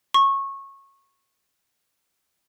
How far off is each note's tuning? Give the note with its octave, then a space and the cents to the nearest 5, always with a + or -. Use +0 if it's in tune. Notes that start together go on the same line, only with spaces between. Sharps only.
C#6 -20